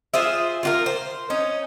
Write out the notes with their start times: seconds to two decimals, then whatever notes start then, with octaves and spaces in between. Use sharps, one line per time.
0.14 F4 G#4 C5 E5
0.63 F4 F#4 A#4
0.86 C5
1.30 C#4 D#4